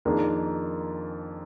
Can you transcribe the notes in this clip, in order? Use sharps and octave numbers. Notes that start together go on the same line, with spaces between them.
F2 D#3 A#3 D4 G#4